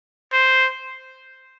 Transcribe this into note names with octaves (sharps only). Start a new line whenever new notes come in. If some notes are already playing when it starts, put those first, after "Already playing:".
C5